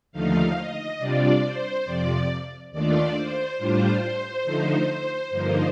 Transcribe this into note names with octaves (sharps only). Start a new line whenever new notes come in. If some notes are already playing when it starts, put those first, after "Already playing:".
D#2 D3 F3 A3 D#4 F5
D#5
C3 G3 D4 F4 D5
C5
F2 C3 F3 D5
D#2 D#3 A3 D4 F4 D5
C5
A2 G3 D4 F4 C5
D3 F3 A3 D#4
G2 D3 F3 A#3 D#4 C5